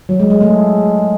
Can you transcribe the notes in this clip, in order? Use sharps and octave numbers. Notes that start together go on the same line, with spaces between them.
F#3
G#3
G#3
A3